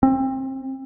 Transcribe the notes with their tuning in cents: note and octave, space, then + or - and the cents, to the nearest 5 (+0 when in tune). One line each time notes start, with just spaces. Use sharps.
C4 +25